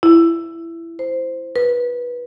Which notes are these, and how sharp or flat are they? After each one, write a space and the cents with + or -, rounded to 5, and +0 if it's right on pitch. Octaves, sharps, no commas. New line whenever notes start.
E4 +15
C5 -5
B4 -20